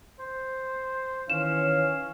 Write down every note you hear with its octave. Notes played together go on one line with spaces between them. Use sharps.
C5
D#3 E3 C#4 F5 E7